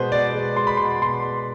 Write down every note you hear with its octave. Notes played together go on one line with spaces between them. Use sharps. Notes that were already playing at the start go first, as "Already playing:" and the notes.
Already playing: B2 G#3 B4 C5
B2 D5
G#3
G#3 C6
B5
B2 C6
B2 C6
G#3